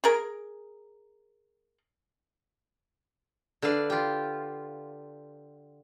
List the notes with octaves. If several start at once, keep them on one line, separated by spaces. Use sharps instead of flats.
G#4 A#4
D3 B4 D5 F5
F4 G4